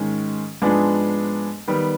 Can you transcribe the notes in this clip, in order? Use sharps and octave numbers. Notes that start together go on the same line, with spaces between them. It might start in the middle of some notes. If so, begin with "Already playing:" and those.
Already playing: G#2 D#3 G#3 C#4
G#2 F3 G#3 B3 D4
D#3 G3 B3